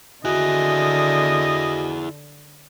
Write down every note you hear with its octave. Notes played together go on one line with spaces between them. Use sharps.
D3 E4 F#4 G#4 D#5